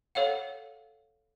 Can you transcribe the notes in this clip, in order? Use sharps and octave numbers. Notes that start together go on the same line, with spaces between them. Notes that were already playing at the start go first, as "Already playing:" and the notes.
A4 C#5 F5 F#5